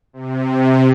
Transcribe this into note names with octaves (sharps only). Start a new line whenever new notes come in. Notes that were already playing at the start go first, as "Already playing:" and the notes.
C3